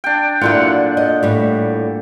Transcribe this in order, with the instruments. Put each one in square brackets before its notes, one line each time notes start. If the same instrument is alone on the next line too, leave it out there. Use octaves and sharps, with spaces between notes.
[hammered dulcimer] D4 G5
[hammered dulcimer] A#2 D3 F#5 [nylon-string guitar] F#3 E4 F4
[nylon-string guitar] D#5
A2 G3